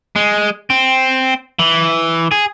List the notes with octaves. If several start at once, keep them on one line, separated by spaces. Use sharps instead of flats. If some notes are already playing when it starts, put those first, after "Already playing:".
G#3
C4
E3
G#4